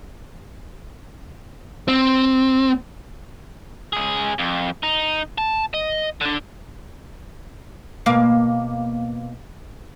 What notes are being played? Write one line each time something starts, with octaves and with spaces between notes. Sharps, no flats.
C4
C#2 G#4
F2
D#4
A5
D#5
D3 D4
B2 A#3 F5